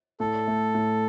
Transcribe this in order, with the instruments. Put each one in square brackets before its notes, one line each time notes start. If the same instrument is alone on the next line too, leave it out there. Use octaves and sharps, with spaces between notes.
[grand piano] A2 [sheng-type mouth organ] A4
[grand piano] A3
A2